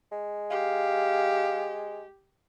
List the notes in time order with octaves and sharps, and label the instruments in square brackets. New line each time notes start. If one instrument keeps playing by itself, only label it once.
[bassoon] G#3
[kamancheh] G4 [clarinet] F5